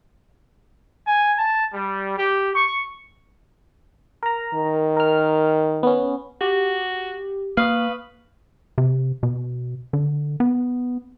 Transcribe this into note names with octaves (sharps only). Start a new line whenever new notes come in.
G#5
A5
G3
G4
C#6
A#4 A#5
D#3
A#4 F6
B3 C#4
F#4 G4
A#3 B4 F5 C#6 D#6
C3
B2
D3
B3